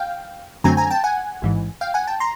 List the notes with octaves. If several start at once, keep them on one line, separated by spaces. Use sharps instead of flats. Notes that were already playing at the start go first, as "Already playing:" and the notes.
Already playing: F5 G5
F#2 D3 F#3 A3 C4 G#5 A#5
G#5 A#5
G5 A5
F#5 G#5
A1 G#2 E3
F5 G5
F#5 G#5
G5 A5
A#5 C6